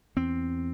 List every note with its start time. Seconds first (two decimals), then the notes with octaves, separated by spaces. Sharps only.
0.16 E2 C4